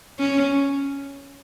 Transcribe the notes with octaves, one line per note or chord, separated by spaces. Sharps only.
C#4